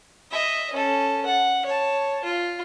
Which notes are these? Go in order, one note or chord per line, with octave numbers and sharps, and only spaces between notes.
D#5 E5
C#4 A4
F#5
C#5 A5
F4